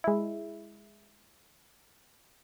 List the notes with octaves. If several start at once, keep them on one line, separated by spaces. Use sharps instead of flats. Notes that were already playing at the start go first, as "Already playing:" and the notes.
G#3 E4